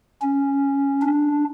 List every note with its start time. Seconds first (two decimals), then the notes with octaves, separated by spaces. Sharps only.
0.22 C#4
1.02 D4